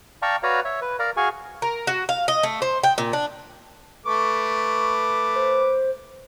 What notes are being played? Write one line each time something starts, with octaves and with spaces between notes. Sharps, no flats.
D5 F5 G5 A5 A#5 C#6
F#4 B4 C#5 D5 F5 A#5
C#5 E5
B4
A#4 D5 F5 A#5
F#4 G#4 F5 G#5 C#6
A#4
F#4
F5
D#5
A3
C5
G5
A#2
D4
A3 B4 C#6 D6
C5